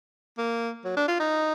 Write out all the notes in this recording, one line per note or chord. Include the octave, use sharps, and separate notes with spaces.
A#3
F#3
D4
F4
D#4